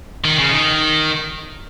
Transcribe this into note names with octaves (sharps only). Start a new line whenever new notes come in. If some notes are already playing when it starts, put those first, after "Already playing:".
D#3
C#3
D#3